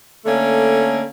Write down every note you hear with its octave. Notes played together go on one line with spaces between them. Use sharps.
D3 A3 A#3 C#4